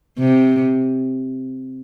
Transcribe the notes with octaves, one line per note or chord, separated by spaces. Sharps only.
C3